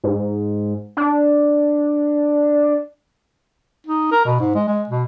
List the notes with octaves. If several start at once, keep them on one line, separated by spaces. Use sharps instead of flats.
G#2
D4
D#4
A#4
B2
G#2
G#3
G#3
B2